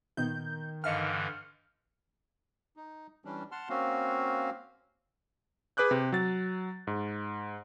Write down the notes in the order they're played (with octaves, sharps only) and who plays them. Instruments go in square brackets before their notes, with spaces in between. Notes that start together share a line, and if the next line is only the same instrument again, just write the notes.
[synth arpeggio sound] A#2 B3 D#4 [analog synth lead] D#3 [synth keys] G6
[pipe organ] G2 D3 E3 [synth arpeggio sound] D#5 F5 [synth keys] F6 C#7
[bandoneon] D#4
E3 G3 C#4 D4
F#5 A5 C6 F6
A#3 C4 C#4 F#4 F5
[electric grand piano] G#4 B4 D6 F#6 G6
C3
F#3 A6
G#2